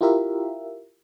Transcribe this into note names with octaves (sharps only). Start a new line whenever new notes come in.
E4 F4 G4 A#4 E5